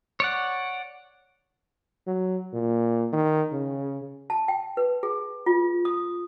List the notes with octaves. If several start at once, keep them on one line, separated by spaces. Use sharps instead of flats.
C#5 D5 F#5
F#3
A#2
D#3
C#3
A5
G5
B4
G#4
F4
D#6